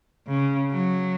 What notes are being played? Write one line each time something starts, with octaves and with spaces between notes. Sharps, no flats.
C#3
F#3